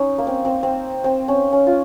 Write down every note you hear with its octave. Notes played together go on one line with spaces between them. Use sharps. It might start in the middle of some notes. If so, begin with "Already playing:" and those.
Already playing: C#4 D#4
A#3
C4
C4
C4
C4
C#4
C#4
F4